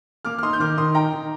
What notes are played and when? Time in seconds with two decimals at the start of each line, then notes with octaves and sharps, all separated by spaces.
0.25 A#3 D6 F6
0.39 F6
0.43 D#4 C6 D#6
0.53 G6
0.59 D#3 D6 F6
0.77 D#3 C6 D#6
0.95 D#4 G5 A#5
1.12 D#3